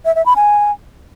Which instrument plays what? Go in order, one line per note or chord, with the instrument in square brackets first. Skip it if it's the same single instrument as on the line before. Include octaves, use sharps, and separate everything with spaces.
[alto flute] E5
E5
B5
G#5